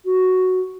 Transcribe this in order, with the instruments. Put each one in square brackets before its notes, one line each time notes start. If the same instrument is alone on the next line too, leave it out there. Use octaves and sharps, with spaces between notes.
[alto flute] F#4